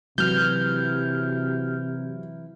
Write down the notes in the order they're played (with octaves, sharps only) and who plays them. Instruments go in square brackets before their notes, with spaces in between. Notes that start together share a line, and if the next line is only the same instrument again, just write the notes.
[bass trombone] C3 [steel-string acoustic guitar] E3 E4 [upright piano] F#3 [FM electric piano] F6 G6